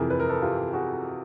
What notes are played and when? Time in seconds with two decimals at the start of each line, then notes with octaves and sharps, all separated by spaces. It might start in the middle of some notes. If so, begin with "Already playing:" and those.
Already playing: F2 C3 E3 G#4 A#4
0.10 B4
0.20 A#4
0.29 A4 B4
0.42 F4 G4
0.73 F#4 G#4